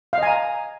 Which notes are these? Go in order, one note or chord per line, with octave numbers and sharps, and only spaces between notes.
D#5 F5 G#5 A#5